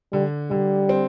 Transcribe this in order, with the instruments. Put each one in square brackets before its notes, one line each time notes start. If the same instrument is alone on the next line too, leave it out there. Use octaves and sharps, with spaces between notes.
[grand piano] D3 [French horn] G3
[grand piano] D3 [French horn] G3
[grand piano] C4